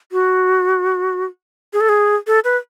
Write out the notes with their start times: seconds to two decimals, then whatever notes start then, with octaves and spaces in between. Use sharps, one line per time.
0.12 F#4
1.73 G#4
1.81 A4
1.89 G#4
2.27 A4
2.44 B4